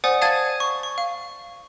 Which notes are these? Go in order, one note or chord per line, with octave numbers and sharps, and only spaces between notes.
C5 D5 F#5 G#5 D#6
F5 A5 D#6 G#6 A6 D#7
C#6
C#6
F5